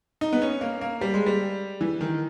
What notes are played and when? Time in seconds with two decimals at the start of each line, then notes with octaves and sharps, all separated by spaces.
0.21 D#4
0.33 B3
0.42 C#4
0.61 A#3
0.81 A#3
1.01 G3
1.14 G#3
1.26 G3
1.81 E3
2.01 D#3